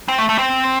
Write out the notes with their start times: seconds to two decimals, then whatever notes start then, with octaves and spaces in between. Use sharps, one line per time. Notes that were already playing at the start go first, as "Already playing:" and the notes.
0.08 C4
0.18 A3
0.29 A3
0.39 C4